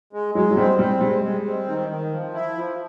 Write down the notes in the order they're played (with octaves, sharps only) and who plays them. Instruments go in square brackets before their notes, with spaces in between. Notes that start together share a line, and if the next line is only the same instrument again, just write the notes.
[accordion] G#3
[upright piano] F#3 [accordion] G#3
[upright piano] F#3
[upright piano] G3 [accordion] C4
[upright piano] G3 [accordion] C4
[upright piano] G3 [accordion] G#3
[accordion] G#3
C4
D#3
D#3
F3
E4
F3